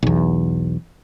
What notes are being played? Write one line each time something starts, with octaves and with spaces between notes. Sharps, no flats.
B1 E2